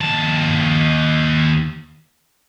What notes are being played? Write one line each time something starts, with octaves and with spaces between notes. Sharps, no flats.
D#2 A5